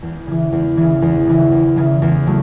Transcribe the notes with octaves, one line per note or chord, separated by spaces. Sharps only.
E2
C#3 E3
E2
C#3 E3
E2
C#3 E3
E2
C#3 E3
E2
C#3 F#3 A3